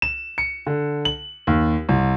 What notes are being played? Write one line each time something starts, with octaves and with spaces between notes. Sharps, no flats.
E7
C#7
D3
F#7
D#2
C2